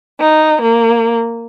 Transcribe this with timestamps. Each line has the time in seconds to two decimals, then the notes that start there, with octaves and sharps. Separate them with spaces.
0.21 D#4
0.63 A#3